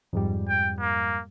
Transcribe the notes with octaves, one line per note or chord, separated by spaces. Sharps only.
F2 G#2 G3
G5
A#3